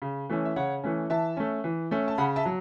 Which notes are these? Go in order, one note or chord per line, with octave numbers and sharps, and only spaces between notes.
C#3
E3 A3 C#4
E5
C#3 C#5 F#5
E3 A3 C#4
E3 E5 A5
A3 C#4
E3
A3 C#4
A5
C#3 F#5 B5
E5 A5
F#3